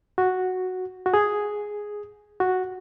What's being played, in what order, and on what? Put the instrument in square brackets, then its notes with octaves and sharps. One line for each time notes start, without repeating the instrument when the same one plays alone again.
[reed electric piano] F#4
F#4
G#4
F#4